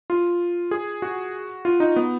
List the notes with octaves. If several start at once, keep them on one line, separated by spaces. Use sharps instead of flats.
F4
G#4
F#4
F4
D#4
B3